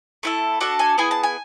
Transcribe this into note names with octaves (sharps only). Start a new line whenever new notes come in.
A3 E4 A4
D4 F#4 A4 F#5
G#5
B3 E4 G#4 G#5
A5
G#5